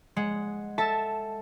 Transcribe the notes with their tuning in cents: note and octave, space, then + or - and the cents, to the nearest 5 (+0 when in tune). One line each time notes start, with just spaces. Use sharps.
G#3 +0 F#5 -5
A4 +5 E5 -10 A5 -5